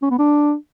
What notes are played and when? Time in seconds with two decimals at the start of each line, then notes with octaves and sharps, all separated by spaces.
0.02 C#4
0.11 B3
0.19 D4